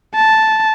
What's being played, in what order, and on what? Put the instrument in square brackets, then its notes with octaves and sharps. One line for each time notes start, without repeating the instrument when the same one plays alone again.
[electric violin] A5